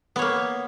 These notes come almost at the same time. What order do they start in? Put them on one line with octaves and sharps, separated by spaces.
B3 C#5 A#3